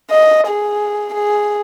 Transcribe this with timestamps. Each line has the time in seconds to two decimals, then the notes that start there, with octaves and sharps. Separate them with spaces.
0.11 D#5
0.47 G#4
1.14 G#4